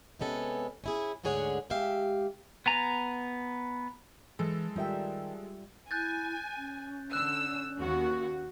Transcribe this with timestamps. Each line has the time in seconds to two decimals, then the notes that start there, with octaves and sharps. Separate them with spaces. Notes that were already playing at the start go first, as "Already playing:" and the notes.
0.19 C3 G#3 B3 C#4 A4
0.84 C#4 E4 G#4
1.23 D2 G#2 D3 G#4 C#5 F#5
1.70 G#3 G4 E5 F5
2.66 B3 G#5 A#5
4.39 E3 G#3 A4
4.76 D#3 G3 F4 E5 G5
5.91 E4 G#5 F#6 G6 A6
6.57 C#4
7.13 D3 E6 F#6
7.80 D#2 F#4